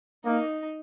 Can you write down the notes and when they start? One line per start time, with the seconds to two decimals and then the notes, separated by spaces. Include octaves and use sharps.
0.25 A#3 D#4